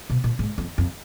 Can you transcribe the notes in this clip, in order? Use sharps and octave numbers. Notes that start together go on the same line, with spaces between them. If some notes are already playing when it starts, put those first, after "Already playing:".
B2
A#2
G#2
F2
F2